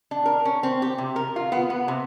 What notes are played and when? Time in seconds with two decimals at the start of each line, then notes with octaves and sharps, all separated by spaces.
0.11 D4
0.26 A#4
0.45 C#4
0.63 C4
0.82 G4
0.98 C3
1.16 A#4
1.36 F4
1.52 B3
1.70 B3
1.88 C3